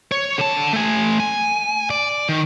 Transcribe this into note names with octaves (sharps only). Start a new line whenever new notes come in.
C#5
D3 A5
A3 G#5
G#5
D5
D#3